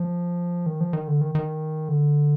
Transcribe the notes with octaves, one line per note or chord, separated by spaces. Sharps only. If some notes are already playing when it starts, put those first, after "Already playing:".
Already playing: F3
D#3
F3
D#3
D3
D#3
D#3
D3